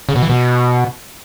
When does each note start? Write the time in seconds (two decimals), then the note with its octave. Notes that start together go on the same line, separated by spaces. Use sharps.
0.09 C#3
0.16 B2
0.22 E3
0.29 B2